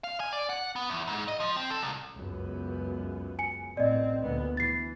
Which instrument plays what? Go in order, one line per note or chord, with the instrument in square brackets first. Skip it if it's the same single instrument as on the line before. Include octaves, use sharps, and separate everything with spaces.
[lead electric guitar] F5
G#5
D5
F#5
B3
E2
G#2
D#5
F3
C4
A4
C2
[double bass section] C#2 F#2 B3
[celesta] G#5 C#7
[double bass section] A1 C4 [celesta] D5 D#5
[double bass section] D2 A#2 B3
[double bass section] E3 [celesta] A6 C7